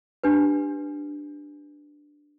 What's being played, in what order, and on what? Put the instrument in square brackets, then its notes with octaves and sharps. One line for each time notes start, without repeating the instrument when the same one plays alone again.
[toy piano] D4 G4 B4